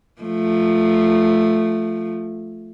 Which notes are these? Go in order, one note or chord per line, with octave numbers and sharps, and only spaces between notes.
F3 A3